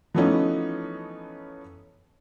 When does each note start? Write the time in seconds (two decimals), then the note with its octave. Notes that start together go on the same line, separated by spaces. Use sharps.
0.14 E3 F3 A3 B3 C#4 D#4